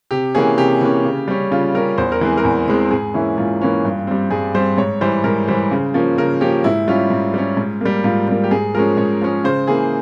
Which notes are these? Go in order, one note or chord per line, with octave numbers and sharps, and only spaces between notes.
C3 G4
E3 A#3 C#4 G#4
C3 G4
E3 A#3 C#4
C#3
G3 C#4
C#3 F4
G3 C#4 A#4
E2 C5
A#4
E3 G#3 C4 G#4
A#4
E2
E3 G#3 C4
G#2 G#4
E3 A#3 C#4 E4
G#2 F4
E3 A#3 C#4
G2
G3 C4
G2 G#4
G3 C4 C5
G#2 C#5
E3 G3 C5
G#2 A#4
E3 G3 C5
C#3
F3 A#3 C#4
C#3 A#4
F3 A#3 C#4 G4
G#2 E4
G3 C#4 F4
G#2
G3 C#4
G#2
G3 A#3
G#2 F4
G3 A#3
G4
G#2 G#4
F3 G#3 C#4 A#4
G#2 C#5
F3 G#3 C#4
C#3 C5
E3 A#3 G#4